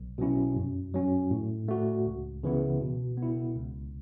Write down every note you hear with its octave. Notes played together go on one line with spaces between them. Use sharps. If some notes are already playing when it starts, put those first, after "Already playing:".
Already playing: B1
B2 F#3 C#4 E4
F#2
F#3 C#4
A2
A3 F#4
C#2
C#3 E3 B3 E4
B2
B3
E4
C#2